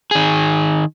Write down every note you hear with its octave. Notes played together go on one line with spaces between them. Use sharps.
D#3 G#4